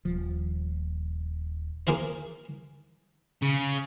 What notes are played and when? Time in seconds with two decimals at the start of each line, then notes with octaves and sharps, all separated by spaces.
0.05 D#1 F3
1.87 A#3 F4 G#4 C5
3.42 C#3